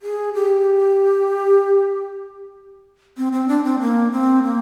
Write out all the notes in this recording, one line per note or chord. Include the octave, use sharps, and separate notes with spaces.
G#4
G4
C4
C4
D4
C4
A#3
C4
A#3